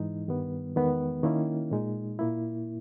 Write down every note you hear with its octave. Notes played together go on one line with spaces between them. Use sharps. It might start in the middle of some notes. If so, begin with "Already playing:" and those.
Already playing: G#2 E3 G#3 D#4
G2 D#3 G3 B3
E2 D#3 G#3 B3
D#3 A#3 C#4 E4
A#2 G#3 D#4
A#2 A#3 E4